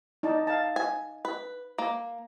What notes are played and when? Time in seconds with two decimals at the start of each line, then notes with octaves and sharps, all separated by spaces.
0.23 D#4 D5 A5
0.47 F5 A5
0.76 G#5
1.25 B4
1.78 A#3